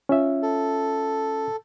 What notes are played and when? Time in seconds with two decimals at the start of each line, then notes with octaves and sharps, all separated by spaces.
0.09 C#4 F4 E5
0.43 A4